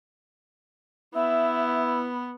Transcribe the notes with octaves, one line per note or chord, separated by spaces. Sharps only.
B3 E4 E5